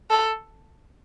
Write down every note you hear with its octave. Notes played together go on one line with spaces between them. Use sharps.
A4